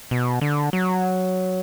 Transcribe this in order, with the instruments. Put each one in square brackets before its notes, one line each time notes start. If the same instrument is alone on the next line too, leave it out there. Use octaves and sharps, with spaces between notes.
[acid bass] B2
D3
F#3